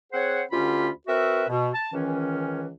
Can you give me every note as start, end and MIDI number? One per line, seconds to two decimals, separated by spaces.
0.13 0.42 60
0.13 0.42 68
0.13 0.42 72
0.13 0.42 73
0.13 0.42 78
0.51 0.89 38
0.51 0.89 50
0.51 0.89 61
0.51 0.89 65
0.51 0.89 67
0.51 0.89 83
1.07 1.44 60
1.07 1.44 66
1.07 1.44 70
1.07 1.44 71
1.07 1.44 76
1.49 1.69 47
1.74 1.88 81
1.93 2.70 37
1.93 2.70 51
1.93 2.70 52
1.93 2.70 61